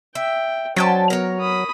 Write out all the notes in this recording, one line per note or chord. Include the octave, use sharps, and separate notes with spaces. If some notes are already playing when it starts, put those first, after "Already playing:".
E5 G5
F#3 C#4 C5 D5 G5 A5
B3 F#4 A#4 C#5
B5 D#6